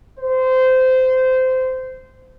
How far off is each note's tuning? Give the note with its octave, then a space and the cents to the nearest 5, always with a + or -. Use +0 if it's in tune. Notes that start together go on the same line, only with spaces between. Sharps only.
C5 -20